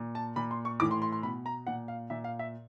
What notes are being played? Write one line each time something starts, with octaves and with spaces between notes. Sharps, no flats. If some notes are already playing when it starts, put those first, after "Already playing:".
Already playing: A#2
A5
A#2 B5
C6
C#6
A2 E3 D6
C6
C6
C6
B2 B5
A#5
A#2 F#5
F5
A#2 E5
F5
E5